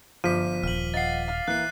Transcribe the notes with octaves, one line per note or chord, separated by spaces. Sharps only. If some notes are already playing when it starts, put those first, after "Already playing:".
G1 F3 D6 B6 D#7
D#1 F6 F#7
D#5 F5 F#5 A6 C7
F5 F6
E3 A#3 F#6 C7